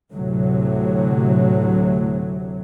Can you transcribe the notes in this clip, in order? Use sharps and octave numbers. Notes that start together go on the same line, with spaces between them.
D2 A2 C3 F#3